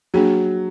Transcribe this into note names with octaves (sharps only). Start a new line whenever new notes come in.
F#3 A#3 D4 G#4